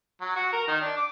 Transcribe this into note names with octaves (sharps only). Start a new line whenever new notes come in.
F#3
F#4
A#4
D#3
D4
D6